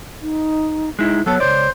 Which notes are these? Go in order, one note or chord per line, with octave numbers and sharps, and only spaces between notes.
D#4
G#3 D#4 E4
F#3 B3 A4 C#5
C#2 B2 C5 D5